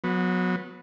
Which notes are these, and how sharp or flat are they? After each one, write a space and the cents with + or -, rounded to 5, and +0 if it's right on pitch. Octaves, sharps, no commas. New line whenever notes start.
F#3 -25 B3 +0